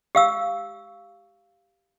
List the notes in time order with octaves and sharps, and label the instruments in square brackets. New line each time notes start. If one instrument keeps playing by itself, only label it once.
[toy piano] G4 F5 E6